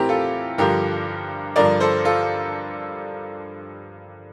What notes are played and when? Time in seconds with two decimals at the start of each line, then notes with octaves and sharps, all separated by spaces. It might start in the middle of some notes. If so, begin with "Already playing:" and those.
Already playing: A2 E3 C4 E4 G4 A#4
0.09 F4 A4
0.58 G2 D3 F3 G4 A#4
1.56 G2 D3 F3 A#4 D5
1.80 A4 C5
2.05 F4 A4